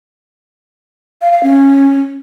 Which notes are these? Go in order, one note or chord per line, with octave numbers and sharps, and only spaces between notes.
F5
F5
C#4